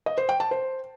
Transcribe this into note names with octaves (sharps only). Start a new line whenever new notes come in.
D#5
C5
G5
A5
C5